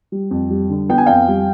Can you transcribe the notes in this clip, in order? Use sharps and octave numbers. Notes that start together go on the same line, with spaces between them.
G3
F2
G3
D3
B3 G5
G#5
F2 F5 G5
G3